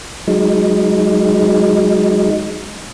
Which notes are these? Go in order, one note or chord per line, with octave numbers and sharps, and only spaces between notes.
F#3 G#3 D#4